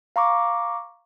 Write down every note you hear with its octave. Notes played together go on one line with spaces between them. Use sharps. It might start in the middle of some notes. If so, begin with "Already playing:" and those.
F5 A#5 C#6 D6